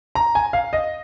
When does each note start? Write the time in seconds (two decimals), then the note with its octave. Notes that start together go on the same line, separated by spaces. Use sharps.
0.15 A#5
0.35 G#5
0.53 F5
0.73 D#5